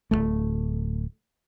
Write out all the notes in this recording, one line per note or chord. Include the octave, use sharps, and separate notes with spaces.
D1 C#2 A3